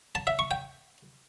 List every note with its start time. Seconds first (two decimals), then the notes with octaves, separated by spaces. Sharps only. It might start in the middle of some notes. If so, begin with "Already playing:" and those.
0.15 A5
0.27 E5
0.39 C#6
0.51 G5